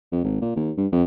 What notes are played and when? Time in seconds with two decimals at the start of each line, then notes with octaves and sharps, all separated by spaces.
0.12 F2
0.24 G#1
0.41 A#2
0.56 D#2
0.78 G2
0.92 F2